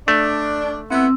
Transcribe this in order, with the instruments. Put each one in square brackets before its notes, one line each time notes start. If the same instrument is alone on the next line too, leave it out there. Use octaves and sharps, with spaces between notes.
[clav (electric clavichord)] A3 [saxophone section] D4
[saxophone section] B3 E4 F#5 [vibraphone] C4 E6